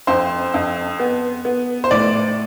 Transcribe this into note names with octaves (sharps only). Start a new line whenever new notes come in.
F2 C5
F2
B3
B3
C5
A2 D5